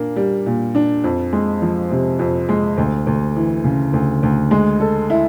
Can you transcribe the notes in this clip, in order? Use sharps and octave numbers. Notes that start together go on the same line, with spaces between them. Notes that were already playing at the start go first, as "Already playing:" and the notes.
Already playing: A#2 A#3 D4
G3
A#2
D4
F2
G#3
F3
C3
F2
G#3
D2
D2
E3
C#3
D2
D2
G#3
A4
E4